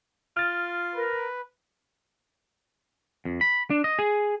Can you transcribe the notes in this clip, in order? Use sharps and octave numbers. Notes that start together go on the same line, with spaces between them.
F4 F6 A6
A#4 B4
F2
B5
D4
D#5
G#4